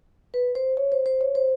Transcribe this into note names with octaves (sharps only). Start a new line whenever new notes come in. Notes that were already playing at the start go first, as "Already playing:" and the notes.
B4
C5
C#5
C5
C5
C#5
C5